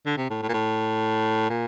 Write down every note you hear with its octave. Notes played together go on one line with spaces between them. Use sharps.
D3
C3
A2
A2
A#2
A2
A#2